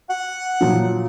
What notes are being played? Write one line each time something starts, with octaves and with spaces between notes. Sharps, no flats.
F#5
A#2 F3 F#3